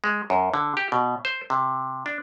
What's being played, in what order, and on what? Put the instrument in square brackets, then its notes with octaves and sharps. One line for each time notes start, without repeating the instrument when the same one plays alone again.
[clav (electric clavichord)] G#3
F#2
D3
G4
B2
C5
C3
D4